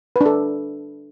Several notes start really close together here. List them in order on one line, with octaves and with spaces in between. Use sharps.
B4 D4 A4